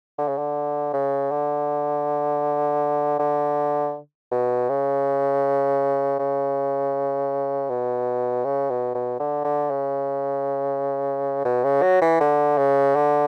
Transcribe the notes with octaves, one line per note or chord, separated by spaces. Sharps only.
D3
C#3
D3
C#3
D3
D3
B2
C#3
C#3
B2
C#3
B2
B2
D3
D3
C#3
B2
C#3
F#3
E3
D3
C#3
D3